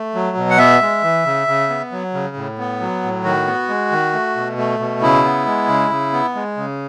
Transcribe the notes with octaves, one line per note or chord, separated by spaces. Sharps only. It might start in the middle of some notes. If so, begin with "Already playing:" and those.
Already playing: A3
F#3
B2
F#5
B3 E5
G#3
E3
C#3
C#3
B3
F#3
C#3
A2
B3
F#3
A2
D#3 F#4
B3
G#3
D#3
A3
B2
A3
B2
C#3 E4
B3
G#3
C#3
C#3
B3
G#3
C#3